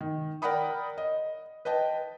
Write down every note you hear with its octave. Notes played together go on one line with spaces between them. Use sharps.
D#3
A#4 D5 F#5 G5 B5 D#6
D#5
B4 D#5 G5 A5